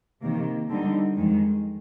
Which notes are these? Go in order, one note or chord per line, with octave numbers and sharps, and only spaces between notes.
C3 D#3 A#3
D3 G3 C4 D#4
F2 D#3 G#3